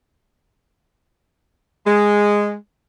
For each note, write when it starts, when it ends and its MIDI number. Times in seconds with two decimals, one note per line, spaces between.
1.86 2.54 56